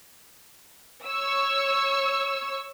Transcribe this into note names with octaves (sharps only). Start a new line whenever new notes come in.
C#5 C#6 E6